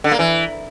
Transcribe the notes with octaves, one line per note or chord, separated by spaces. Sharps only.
D3
A#3
E3